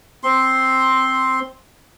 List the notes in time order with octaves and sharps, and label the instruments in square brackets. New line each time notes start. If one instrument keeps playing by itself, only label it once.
[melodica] C4 C6